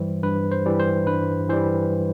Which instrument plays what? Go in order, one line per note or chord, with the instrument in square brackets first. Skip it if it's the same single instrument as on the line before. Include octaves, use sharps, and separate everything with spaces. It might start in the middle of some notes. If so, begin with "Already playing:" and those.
Already playing: [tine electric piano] G2 E3 G3 C5
G2 B4
C5
E3 G3
C5
G2 B4
E3 G3 C5